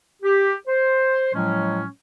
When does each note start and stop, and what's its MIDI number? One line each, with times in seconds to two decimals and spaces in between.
0.22 0.54 67
0.67 1.31 72
1.34 1.85 45
1.34 1.85 53
1.34 1.85 54
1.34 1.85 56
1.34 1.85 61